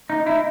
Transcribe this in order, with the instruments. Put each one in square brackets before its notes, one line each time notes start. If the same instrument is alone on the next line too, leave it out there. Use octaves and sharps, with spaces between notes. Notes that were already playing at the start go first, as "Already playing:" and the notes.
[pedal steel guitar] D#4
E4